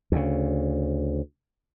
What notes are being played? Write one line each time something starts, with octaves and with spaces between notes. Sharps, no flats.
D2 C#3